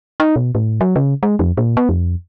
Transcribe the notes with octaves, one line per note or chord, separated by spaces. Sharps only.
D#4
B2
A2
F#3
C#3
G#3
F2
A#2
B3
F2